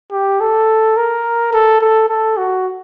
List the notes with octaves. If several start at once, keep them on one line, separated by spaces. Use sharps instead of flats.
G4
A4
A#4
A4
A4
A4
F#4